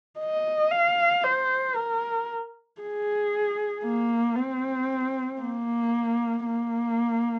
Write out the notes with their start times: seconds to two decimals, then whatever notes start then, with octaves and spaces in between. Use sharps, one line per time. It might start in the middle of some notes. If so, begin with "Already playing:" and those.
0.19 D#5
0.71 F5
1.24 C5
1.75 A#4
2.81 G#4
3.84 A#3
4.36 C4
5.41 A#3
6.46 A#3